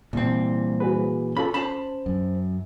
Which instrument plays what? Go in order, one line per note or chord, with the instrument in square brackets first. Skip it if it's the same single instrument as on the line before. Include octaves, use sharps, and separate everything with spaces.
[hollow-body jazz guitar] C2 C4 [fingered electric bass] A#2 E3
[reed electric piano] F#4 G#4 B4
[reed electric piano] C#4 F4 A4 [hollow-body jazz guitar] B5
[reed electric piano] C#4 [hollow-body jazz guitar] C5 A5 B5
[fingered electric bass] F#2